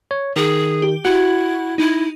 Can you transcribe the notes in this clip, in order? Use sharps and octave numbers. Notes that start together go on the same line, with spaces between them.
C#5
D#3 G#4
G4
E4 F#4 F#5
D#4 E4